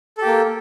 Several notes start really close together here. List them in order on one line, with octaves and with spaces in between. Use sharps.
A4 G4 A#3